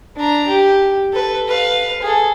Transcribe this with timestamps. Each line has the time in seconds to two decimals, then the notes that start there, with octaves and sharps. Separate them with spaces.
0.16 D4 A#5
0.48 G4
1.13 A4 B4
1.48 B4 F5
2.02 G#4 A4